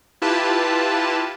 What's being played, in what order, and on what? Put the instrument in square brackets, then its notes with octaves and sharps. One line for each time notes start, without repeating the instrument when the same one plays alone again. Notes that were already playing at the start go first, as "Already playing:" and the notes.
[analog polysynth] E4 F4 G4 B4 A5